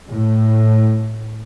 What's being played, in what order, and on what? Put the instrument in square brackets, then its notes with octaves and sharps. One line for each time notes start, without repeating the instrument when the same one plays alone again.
[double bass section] A2